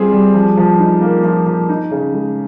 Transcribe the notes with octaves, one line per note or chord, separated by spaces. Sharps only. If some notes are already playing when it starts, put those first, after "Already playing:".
Already playing: G3 C4 F4 G#4
G3
F3
F3
D#4
A#3
F3
F3
D#4
C#3
G#3